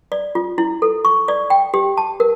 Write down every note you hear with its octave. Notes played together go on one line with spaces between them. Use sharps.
D5
F4
E4
A4
C#6
D5
G5
G4
A5
A#4